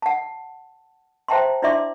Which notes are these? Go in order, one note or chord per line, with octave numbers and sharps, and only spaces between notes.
F#5 A5
C5 E5 G5 A5 A#5 C6
D4 E4 D5 E5 C6 D6